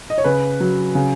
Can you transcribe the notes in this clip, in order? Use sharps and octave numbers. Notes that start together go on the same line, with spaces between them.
D#5
C#5
C#3 B4
F#3
C#3